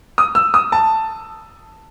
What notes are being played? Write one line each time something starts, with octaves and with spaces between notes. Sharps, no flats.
D#6
E6
D#6
A5